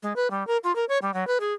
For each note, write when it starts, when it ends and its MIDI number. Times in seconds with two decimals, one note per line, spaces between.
0.03 0.13 56
0.16 0.30 71
0.31 0.46 55
0.47 0.57 70
0.64 0.74 65
0.76 0.85 70
0.89 0.98 73
1.02 1.13 55
1.14 1.27 54
1.27 1.38 71
1.40 1.53 68